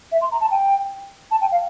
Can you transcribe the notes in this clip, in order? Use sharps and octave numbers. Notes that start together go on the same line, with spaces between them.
E5
C6
A#5
A5
G5
A5
G5
F5